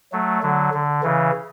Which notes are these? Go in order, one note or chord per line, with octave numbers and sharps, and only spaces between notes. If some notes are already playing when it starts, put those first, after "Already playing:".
F#3 A3
D3 F#3
D3
C#3 E3